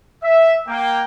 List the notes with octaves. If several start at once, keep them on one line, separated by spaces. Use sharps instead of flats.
E5
A#3 G5